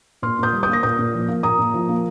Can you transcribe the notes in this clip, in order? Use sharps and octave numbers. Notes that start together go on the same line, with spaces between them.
A#2 C6 F6
A#2 D#6 G6
G3
D#6 G6
A#3 A#6
A#2 D#6 G6
A#2
F3
A#3
A#2 A#5 D#6
A#2
F3
A#3